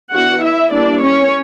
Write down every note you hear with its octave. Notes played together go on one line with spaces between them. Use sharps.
E3 B3 D4 F#4 F#5
E4 E5
G3 A#3 D4 E4 D5
C#4 C#5